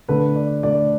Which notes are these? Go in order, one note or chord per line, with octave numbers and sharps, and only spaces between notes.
D3 A3 B4
D5
D3 A3 D5